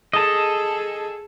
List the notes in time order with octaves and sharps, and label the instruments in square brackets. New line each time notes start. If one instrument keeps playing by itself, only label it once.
[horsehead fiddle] G#4 A4 [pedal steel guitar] D#5 A5